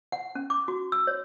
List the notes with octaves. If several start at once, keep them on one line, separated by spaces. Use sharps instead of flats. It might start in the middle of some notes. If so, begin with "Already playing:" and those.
F#5
C#4
D6
F#4
E6
C#5